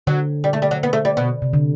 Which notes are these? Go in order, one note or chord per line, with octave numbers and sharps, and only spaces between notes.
D3 F#3
G3
A3
G3
F#3
B3
A3
G3
B2
C3
D3